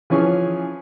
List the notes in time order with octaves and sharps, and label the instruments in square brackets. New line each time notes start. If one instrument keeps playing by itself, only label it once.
[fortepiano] E3 F3 C#4 G#4 G#5